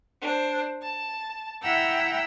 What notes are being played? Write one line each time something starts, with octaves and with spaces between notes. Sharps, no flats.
D4 C5
A5
E4 E5 F#5 G5 A#5 E6